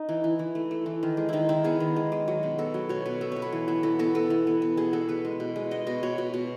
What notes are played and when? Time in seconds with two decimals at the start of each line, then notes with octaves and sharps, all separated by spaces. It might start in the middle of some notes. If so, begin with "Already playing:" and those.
Already playing: D#4
0.09 E3
0.24 E3
0.39 E3
0.55 A3
0.71 A3
0.86 E3
1.03 D#3
1.17 G#3
1.29 D#3 D#4 E4
1.49 D#3 E4
1.64 B3 G#4
1.80 D#3
1.96 G#3
2.12 G#3
2.28 F#3
2.43 B2
2.58 B3 A4
2.74 F#3
2.89 B2 C#5
3.06 B2 B4
3.21 B3 A4
3.32 B2 C#5
3.42 B4
3.52 E3
3.68 B3
3.83 E3 A4
3.99 B3 A4
4.15 B3 A4
4.30 E3
4.47 B3
4.62 B3
4.77 B2 G#4
4.93 B3 A4
5.09 B3 B4
5.25 G#3
5.40 B2
5.56 G#3
5.71 B3 D#5
5.87 B2 D#5
6.03 B2 C#5
6.18 B2
6.34 B2